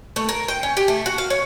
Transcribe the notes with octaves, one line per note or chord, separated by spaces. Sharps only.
A3
A#4
G5
C#4
G4
A3
F#4
F5
C#5